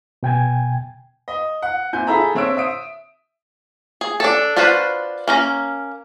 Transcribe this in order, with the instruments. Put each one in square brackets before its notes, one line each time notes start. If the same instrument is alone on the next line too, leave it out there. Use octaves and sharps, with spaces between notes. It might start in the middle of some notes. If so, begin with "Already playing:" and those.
[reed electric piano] B2 G5 G#5 G#6
[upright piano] D#5
F#5
A#2 C4 E4 G#5 G6
E4 G#4 A4 E5 A#5 B5
D3 C4 C#5 E5 E6 D7
E5 D#6 D7
[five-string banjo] G#4
D4 A4
D4 F4 F#4 B4 C5
A#3 C#4 A#5